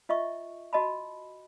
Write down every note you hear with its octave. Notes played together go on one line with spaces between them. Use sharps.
F4 D#5 E5 C#6
F#4 D#5 A5 B5